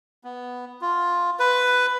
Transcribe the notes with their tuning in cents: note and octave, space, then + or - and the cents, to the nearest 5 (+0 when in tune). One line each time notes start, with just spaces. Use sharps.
B3 +0
F4 +5
B4 +10